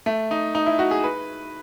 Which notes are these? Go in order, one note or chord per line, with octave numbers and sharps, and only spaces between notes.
A3
D#4
D#4
E4
F#4
G#4
B4